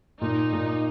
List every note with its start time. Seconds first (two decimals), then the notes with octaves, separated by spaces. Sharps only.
0.21 A#2 D#4
0.53 A#2